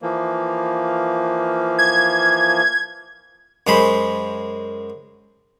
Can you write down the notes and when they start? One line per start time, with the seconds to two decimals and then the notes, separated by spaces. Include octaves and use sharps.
0.02 E3 F3 A#3
1.78 G#6
3.67 F#2 G#3 C5 B5